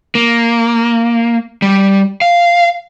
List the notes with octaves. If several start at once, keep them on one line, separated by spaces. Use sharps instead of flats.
A#3
G3
F5